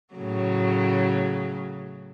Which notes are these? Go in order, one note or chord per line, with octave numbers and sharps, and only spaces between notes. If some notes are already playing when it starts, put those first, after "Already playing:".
A2 C#3 F#3